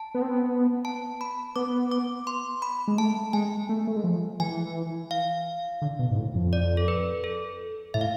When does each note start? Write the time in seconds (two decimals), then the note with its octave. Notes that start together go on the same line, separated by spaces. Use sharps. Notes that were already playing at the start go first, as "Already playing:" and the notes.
Already playing: A5
0.15 B3
0.22 C4
0.29 B3
0.85 A5
1.21 B5
1.56 B3 D6
1.91 D6
2.27 C6
2.62 B5
2.88 G#3
2.98 A3 A5
3.33 G#3 G#5
3.69 A3
3.87 A3
3.96 G#3
4.04 F3
4.40 E3 G#5
5.11 F5
5.82 D3
5.99 B2
6.11 G#2
6.17 A2
6.35 F2
6.53 D5
6.77 A4
6.88 B4
7.24 A4
7.94 A2 E5
8.01 F5